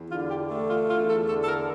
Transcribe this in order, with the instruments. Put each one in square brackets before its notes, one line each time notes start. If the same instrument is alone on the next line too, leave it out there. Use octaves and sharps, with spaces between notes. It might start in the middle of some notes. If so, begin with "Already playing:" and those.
Already playing: [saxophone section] E2
D3 F4
G4
A3
F4
E2 F4
A4
D3 A4
A4
A#4